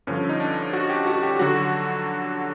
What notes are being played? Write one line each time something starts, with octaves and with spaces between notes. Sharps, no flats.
G2 D3 F3 C#4
D#4
D4
F#4
G4
F#4
G4
D3 F#3 F#4